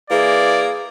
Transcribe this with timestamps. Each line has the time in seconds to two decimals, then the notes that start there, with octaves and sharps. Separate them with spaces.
0.11 E3 A#3 G#4 D5